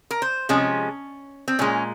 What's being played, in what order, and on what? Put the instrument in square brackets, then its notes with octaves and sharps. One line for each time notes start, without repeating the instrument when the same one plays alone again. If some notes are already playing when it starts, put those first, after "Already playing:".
[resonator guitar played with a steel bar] A#4
C5
C3 F3 G#3 C#4
C4
A#2 G#3 C#4